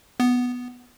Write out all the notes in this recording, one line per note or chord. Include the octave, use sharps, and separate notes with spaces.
B3